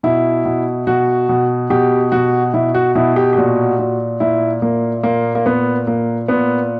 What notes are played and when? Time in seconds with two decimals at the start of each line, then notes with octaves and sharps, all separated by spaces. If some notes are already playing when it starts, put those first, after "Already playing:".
0.03 B2 E4
0.45 B2
0.87 B2 F#4
1.29 B2
1.70 B2 G4
2.12 B2 F#4
2.54 B2 E4
2.74 F#4
2.95 B2 E4
3.16 G4
3.33 G4
3.37 A#2 F#4
3.79 A#2
4.20 A#2 E4
4.62 A#2 A#3
5.03 A#2 A#3
5.35 A#3
5.46 A#2 B3
5.87 A#2 A#3
6.28 A#2 B3